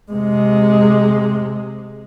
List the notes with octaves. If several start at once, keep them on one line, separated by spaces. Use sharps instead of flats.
C3 G#3